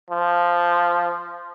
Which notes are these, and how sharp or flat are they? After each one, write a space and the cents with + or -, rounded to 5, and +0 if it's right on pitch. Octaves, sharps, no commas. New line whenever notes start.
F3 -5